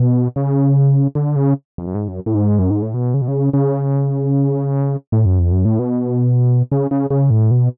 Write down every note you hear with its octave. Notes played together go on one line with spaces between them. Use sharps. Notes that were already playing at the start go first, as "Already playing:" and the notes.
Already playing: B2
C#3
D3
C#3
F2
F#2
G#2
F#2
A2
G#2
F#2
G#2
A2
B2
C#3
B2
C#3
C#3
A2
F#2
F2
F#2
A2
B2
C#3
C#3
C#3
A2
B2